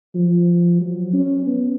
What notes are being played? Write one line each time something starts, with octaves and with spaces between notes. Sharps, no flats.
F3
F#3
C#4
B3